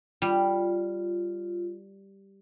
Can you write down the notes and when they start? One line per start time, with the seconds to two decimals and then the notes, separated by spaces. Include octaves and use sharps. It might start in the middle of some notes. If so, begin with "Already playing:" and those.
0.22 G3 F4